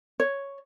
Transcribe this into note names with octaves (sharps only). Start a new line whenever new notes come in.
C#5